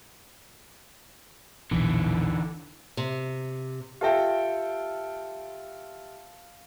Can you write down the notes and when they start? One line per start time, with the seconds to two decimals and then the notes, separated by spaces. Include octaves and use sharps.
1.71 A#1 E2 B2 D3 E3
2.97 C3
4.01 F4 G4 A4 E5 G5